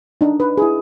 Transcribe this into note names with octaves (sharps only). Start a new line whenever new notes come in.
D4 D#4
B4
E4 G#4